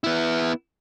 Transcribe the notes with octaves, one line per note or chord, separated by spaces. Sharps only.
B3 E4